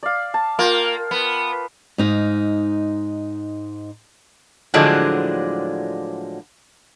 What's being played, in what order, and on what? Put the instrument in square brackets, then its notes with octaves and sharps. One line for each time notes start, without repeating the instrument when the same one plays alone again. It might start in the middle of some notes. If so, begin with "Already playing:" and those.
[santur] D5 F5
A5
[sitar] A#3 [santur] F4 G5
[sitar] B3
[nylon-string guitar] G#2 D#4 F5
[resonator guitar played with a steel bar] A2 D3 F3 F#3 G#3 D4